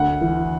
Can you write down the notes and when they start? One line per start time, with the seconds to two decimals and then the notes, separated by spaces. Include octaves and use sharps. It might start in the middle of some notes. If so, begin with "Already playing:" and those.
Already playing: D2 F#5
0.21 E3